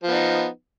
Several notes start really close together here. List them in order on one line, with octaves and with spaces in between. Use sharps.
F3 B3 D#4